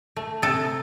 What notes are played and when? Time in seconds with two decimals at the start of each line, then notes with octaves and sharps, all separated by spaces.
0.16 A3
0.42 C3 A4